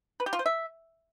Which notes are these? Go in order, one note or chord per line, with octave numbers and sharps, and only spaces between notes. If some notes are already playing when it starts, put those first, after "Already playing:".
B4
G4
F4
C5
E5